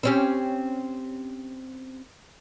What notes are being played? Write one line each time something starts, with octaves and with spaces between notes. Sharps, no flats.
C4 C#4 G4